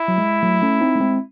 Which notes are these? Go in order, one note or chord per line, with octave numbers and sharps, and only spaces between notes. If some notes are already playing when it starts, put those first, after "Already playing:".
Already playing: E4
F#3
G#3
F#3 A3
A3 C#4
C4 D#4
A3
G#3 C4